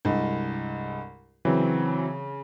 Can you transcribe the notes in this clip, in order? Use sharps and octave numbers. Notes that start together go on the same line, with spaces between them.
C2 G2 G#3
C#3 E3 F#3 C4